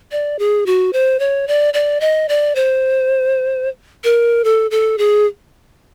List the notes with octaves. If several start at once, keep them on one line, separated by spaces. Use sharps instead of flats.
D5
G#4
F#4
C5
C#5
D5
D5
D#5
D5
C5
A#4
A4
A4
G#4